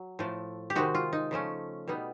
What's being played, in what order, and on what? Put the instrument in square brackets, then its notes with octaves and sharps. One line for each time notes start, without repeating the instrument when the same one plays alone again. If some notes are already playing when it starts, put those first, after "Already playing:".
Already playing: [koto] F#3
A2 F3 A3
G4
C3 D#3 G#3 C4 D#4 F#4
F4
D#4
C#3 F3 A3 C#4
B2 G3 B3 D#4